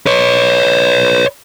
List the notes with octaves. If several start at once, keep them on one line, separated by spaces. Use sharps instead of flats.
B4 C#5